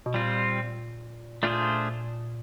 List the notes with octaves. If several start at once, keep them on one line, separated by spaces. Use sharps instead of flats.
B2
A#2 G3 C4 F4
A#2 A3 D4 F4 G#4 C5